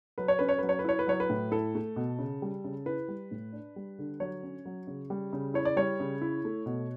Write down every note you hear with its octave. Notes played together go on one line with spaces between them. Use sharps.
F#3 B4
C#5
C#4 B4
C#5
F#3 B4
C#5
B4
E4 C#5
B4
F#3 C#5
B4
A2
E4 A4
A3
B2
C#3
G3
C#3
E4 B4
G3
A2
D4
G3
D3
F#3 C#5
C#4
F#3
C#3
G3
C#3
E4 C#5
D5
G3 C#5
C#3
E4
A3
B2